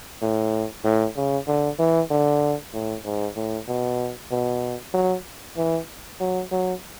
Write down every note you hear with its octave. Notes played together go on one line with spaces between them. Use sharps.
A2
A2
C#3
D3
E3
D3
A2
G#2
A2
B2
B2
F#3
E3
F#3
F#3